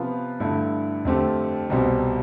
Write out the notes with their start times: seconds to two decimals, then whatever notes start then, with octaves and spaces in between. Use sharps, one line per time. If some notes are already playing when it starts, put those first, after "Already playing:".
Already playing: C3 F3 B3 F4
0.40 G2 D3 A3 E4
1.05 F2 D3 A3 C4 G4
1.70 C2 B2 G3 C4